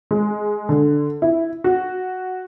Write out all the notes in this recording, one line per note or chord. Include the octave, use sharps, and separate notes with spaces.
G#3
D3
E4
F#4